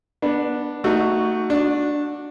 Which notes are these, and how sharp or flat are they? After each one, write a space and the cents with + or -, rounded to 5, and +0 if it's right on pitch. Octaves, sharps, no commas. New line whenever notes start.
B3 -15 D4 +5
A3 +25 D#4 +0 F#4 +0
D4 +0 F#4 -20